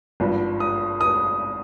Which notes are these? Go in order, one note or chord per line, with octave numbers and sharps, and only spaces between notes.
G#1 G2 F3
D#6
D#6